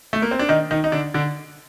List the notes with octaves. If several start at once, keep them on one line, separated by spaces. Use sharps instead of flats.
A3
A#3
C4
D4
D#3 D#4
D#3 D#4
D#4
D3 D4
D3 D4